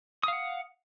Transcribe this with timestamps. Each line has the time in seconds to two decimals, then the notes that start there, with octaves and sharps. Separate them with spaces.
0.23 D#6
0.28 F5
0.33 F#5